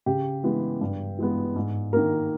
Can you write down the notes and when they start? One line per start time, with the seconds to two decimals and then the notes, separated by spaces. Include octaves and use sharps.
0.06 C#3 G4
0.44 E3 G#3 B3
0.81 G2
1.18 E3 G#3 B3
1.56 G#2
1.93 D#3 A#3 A#4